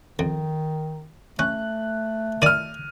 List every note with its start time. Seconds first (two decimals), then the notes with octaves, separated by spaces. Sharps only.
0.19 F2 D#3
1.39 A3 C#4 F#6
2.42 D#3 D5 F6 D#7